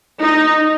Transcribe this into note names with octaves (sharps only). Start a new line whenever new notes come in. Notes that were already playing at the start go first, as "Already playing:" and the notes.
D#4